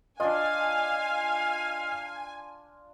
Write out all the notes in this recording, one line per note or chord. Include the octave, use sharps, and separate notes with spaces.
D4 F4 D#5 F5 G#5